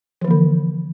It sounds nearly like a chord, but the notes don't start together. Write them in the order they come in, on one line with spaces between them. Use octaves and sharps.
F3 E3 A#3 D3